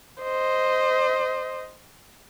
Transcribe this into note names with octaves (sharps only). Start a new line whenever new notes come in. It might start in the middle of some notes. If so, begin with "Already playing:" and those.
C5 D#5